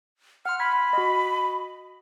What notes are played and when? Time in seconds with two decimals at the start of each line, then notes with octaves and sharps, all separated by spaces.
0.46 F#5 C6 F6
0.59 B5 F6 G#6 B6
0.93 F#4 D#5